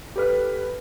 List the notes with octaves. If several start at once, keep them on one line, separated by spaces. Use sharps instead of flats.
G4 A4 B4 F6